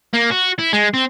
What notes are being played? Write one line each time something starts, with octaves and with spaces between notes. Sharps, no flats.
A#3
F#4
E4
G#3
C4